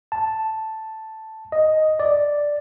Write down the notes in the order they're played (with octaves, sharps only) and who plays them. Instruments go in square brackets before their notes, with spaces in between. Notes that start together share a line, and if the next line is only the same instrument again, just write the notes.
[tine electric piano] A5
D#5
D5